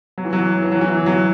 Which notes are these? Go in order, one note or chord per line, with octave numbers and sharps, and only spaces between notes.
F#3
E3
F#3
E3
F#3
E3
F#3